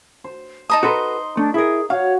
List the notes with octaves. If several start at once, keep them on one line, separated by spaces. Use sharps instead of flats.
C5
D#4 A5 A#5 D#6
F#4 A4 B4 C6
A3 D4
E4 G#4 A#4
F#4 C#5 F5